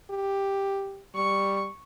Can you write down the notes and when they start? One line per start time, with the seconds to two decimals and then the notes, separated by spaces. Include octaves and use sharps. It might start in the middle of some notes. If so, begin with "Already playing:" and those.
0.11 G4
1.15 G3 C#6